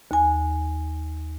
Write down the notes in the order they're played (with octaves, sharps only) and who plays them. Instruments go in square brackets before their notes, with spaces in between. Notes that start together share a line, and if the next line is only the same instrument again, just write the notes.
[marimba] D#2 G#5